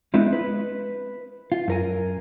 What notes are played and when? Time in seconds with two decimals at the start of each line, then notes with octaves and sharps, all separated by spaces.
0.14 G#3 B3 C4 D4 E4 F4
0.33 B4
1.52 F4
1.68 F#2 A#4 G#5